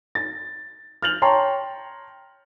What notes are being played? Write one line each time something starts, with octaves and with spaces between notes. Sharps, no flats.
A6
F6 G6 A6 F7 F#7
C#5 G5 A5 A#5 C6 C#6